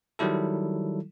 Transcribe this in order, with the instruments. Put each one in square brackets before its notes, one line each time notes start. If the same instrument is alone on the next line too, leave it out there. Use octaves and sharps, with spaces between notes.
[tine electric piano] D#3 F#3 G3 E4 A4